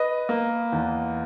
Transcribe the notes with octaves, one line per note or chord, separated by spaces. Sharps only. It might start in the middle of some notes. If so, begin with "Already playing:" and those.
Already playing: B4 D#5
A#3
E2